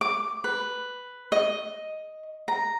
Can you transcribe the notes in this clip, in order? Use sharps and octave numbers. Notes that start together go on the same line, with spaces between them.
D6
B4
D#5
A#5